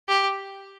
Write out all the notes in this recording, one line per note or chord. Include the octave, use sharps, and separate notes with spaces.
G4